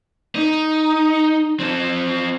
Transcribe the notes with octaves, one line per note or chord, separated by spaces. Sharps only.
D#4
C4 A4